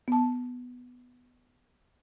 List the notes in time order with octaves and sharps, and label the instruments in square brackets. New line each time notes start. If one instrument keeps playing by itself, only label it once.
[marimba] B3 A5